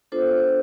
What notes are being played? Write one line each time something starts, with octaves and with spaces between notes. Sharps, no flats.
B3 D4 F4 A4 C5